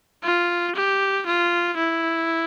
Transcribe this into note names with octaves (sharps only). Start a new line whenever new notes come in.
F4
G4
F4
E4